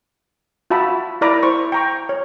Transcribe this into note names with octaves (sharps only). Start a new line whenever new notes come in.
F4 F#4 E5 A5 B5
E4 A#4 D5 A#5 B5 D6
E4 C5 C#6
G5 A#5 C#6
C#5